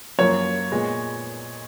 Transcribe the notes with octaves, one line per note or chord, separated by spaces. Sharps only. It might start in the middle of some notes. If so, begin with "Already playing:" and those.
F#2 F3 A#3 C#5
A#2 G#3 B3